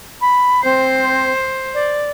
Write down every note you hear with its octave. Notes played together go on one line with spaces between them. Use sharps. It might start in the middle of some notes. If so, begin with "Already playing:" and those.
B5
C4 C5
D5